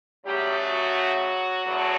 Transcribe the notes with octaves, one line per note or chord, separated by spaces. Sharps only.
F#2 C#3 F#3 G3 A3 G4
F#3 F#4
E2 C#3 F#3 A3